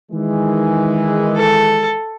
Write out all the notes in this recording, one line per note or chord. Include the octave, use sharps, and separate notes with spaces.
D#3 E3 G#3
A4